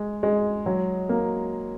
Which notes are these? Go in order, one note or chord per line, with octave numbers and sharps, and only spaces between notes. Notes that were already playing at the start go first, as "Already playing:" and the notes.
Already playing: G#3
G#3
F#3
A#3